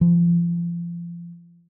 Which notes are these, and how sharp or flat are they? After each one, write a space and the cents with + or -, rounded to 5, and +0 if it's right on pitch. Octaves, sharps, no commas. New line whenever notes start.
F3 -30